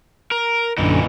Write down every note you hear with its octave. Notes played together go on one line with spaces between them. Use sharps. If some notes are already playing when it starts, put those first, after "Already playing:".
A#4
A#1 F#2 A#2 D3 E3 D#4